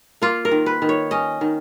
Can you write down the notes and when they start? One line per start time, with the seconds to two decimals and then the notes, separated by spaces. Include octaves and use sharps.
0.22 A#3 F4
0.45 A#4
0.51 D#3
0.66 B4
0.82 D#3
0.89 C#5
1.11 C#4 D#5
1.41 D#3